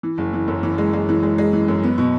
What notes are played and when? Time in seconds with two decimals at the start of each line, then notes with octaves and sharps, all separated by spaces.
0.03 E3
0.18 F#1
0.33 E3
0.48 F#2
0.63 E3
0.78 G#3
0.93 G#3
1.09 E3
1.23 G#3
1.38 G#3
1.53 E3
1.68 F#2
1.83 B3
1.98 B2